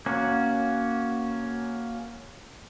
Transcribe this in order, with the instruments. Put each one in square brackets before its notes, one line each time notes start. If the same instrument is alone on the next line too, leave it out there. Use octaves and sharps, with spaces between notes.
[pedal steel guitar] A#3 C#4 F#4